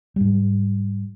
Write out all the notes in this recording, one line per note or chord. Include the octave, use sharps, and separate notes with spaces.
G#2 G3